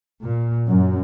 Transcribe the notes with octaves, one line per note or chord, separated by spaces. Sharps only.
A#2
F#2